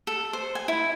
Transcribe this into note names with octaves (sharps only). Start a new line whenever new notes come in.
A4
C5
G#5
E4